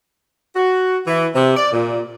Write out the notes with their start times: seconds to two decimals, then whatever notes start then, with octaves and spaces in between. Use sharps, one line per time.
0.55 F#4
1.07 E3
1.35 C3
1.57 D5
1.73 A#2